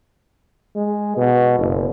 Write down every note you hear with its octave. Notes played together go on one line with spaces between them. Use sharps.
G#3
B2
F#1